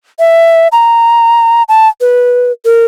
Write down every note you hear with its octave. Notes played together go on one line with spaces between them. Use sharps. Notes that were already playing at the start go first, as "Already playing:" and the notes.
E5
A#5
A5
B4
A#4